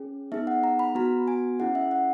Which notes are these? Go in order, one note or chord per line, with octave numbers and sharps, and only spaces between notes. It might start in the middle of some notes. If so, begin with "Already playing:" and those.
Already playing: C#4 G#4
B3 D#4 G#4 E5
F#5
A#5
B5
B3 F#4 A#5
G#5
C#4 E4 G#4 F#5
E5
F#5